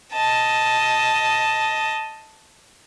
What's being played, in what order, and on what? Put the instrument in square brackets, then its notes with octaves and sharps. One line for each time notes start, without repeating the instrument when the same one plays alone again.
[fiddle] D#5 A5